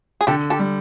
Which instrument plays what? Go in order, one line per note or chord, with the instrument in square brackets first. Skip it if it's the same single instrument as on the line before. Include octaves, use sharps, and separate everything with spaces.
[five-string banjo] G#4
[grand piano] D3 [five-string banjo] G4 A4
[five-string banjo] G4 A4
[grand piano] G3